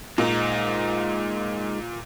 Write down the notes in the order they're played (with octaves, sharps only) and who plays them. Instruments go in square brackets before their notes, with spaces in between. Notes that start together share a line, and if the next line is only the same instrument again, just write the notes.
[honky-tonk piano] A#2 [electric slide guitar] G#3 D#4